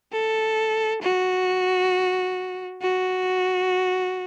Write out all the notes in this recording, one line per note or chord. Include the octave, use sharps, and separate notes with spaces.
A4
F#4
F#4